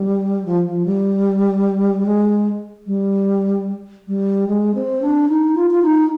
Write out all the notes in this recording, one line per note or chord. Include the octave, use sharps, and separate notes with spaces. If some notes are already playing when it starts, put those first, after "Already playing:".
Already playing: G3
F3
F3
G3
G#3
G3
G3
G#3
C4
D4
D#4
F4
F4
D#4